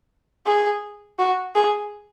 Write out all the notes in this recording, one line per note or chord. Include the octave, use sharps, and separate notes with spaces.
G#4
F#4
G#4